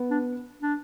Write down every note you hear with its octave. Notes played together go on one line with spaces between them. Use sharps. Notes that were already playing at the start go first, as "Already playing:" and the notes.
Already playing: B3
D4
D4